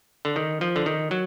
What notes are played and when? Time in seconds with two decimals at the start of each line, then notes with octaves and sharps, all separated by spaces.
0.25 D3
0.36 D#3
0.61 F3
0.76 D3
0.86 D#3
1.11 F#3